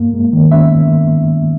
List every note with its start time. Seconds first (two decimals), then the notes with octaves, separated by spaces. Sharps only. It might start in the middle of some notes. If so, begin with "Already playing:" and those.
Already playing: G2 A#3
0.14 G#3
0.33 D#3
0.51 C#4 E5